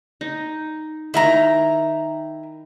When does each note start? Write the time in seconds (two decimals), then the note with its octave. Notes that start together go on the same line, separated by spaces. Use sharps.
0.21 D#4
1.14 D#3 D#4 E4 A#4 A#5